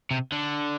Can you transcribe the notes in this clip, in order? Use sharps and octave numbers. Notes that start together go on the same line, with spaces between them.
C3
D3